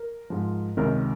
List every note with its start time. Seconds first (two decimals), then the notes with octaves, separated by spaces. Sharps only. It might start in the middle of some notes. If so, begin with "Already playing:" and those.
Already playing: A#4
0.30 G#2 F3
0.77 C#2 C3 D#3 A#4